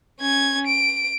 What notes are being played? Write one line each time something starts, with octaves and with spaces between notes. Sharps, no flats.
C#4 G#6
D7